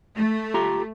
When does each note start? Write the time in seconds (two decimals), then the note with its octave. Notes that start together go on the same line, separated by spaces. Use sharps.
0.15 A3
0.54 F4 G4 A#5